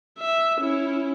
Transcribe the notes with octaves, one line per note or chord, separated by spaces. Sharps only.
E5
C#4 E4